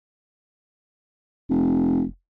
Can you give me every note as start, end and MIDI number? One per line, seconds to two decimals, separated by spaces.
1.50 2.03 29